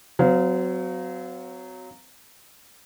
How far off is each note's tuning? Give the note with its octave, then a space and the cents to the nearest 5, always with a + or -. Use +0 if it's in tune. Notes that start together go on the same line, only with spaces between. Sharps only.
F#3 +0 C4 -40 F5 +0